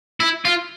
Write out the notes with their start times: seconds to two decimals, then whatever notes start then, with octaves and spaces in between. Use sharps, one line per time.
0.20 E4
0.45 F4